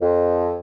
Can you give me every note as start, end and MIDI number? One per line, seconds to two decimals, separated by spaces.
0.02 0.57 41